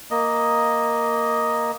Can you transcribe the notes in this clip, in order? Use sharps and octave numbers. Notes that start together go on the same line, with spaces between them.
A#3 D#5